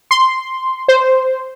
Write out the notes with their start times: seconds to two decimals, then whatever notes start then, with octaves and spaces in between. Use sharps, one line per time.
0.11 C6
0.88 C5